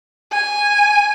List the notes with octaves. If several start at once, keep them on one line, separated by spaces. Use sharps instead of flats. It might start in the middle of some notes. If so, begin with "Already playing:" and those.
G#5